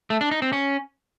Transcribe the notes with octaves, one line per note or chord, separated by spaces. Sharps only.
A3
D4
D#4
C4
C#4